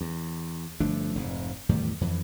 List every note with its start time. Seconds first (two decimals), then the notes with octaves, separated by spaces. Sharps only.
0.01 E2
0.80 G1 F3 A3 D4
1.15 F1 G#2
1.69 E2 A2 D#3 G3
2.01 F2 E3